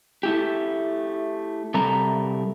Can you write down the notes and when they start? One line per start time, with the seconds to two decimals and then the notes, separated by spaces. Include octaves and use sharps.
0.23 A3 E4 G4
1.74 C3 G3 A4 A#4 A#5